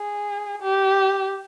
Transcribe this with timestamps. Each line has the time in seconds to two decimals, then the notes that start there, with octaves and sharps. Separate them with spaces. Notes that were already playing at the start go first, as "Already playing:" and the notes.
Already playing: G#4
0.62 G4